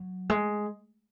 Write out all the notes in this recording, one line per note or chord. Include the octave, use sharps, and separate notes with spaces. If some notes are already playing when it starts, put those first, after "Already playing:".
Already playing: F#3
G#3